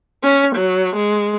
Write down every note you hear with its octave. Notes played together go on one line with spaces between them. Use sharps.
C#4
F#3
G#3